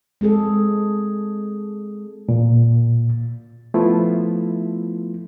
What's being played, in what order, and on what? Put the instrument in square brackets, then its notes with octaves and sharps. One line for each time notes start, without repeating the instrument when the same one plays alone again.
[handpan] G#3 C4 G#4 A4
[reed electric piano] A#2
F3 A3 B3 E4 F4